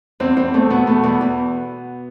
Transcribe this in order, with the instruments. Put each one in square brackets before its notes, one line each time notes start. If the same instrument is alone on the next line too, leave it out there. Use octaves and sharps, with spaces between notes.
[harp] E2 [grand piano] C4
[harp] E2 [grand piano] C4
[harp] E2 [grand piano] A3
[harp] B2 [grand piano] B3
[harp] B2 [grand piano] A3
[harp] E2 [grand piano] B3
[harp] E2